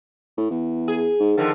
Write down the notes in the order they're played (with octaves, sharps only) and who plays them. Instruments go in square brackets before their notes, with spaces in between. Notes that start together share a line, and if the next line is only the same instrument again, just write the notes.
[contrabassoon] A2
E2
[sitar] G#4
[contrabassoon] G#2
[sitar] D3 F3 [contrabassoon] D#3